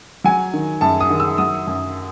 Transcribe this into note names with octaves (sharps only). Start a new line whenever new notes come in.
F#3 G#5
D#3
F#2 A5
D#6
D#3
E6
F#3 D#6
F#2